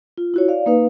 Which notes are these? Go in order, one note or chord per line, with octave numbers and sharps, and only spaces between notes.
F4
E4 F#4 C#5
D5 F5
A#3 D#4 B4 F5